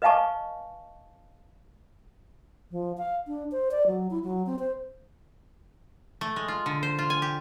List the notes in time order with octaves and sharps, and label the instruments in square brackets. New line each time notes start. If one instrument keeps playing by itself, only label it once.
[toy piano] B4 D#5 F5 G#5 A5 C#6
[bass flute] F3
F5
D4
C5
D5
F#3
E4
F#3
C4
C5
[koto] A3
G#3
F4
D3
C5
F4
G#5
G4